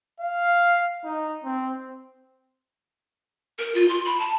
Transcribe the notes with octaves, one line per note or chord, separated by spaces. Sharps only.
F5
D#4
C4
A#4
F4
C6
B5
A5